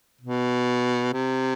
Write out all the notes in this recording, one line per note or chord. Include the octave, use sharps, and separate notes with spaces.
B2
C3